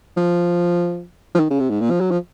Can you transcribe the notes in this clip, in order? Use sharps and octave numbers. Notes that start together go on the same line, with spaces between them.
F3
F3
D#3
C#3
C3
G#2
A#2
F3
F#3
F3